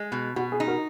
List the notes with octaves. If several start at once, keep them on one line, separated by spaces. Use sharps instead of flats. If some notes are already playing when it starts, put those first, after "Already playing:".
Already playing: G#3
B2
B2 F#4
G#4
D#4
F#4 A#4